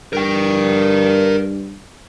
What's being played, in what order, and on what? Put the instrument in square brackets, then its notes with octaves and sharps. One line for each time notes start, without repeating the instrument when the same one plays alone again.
[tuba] G2 [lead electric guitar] A#4 G5